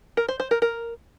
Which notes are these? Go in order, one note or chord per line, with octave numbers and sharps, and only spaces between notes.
A#4
C5
C5
A#4
A#4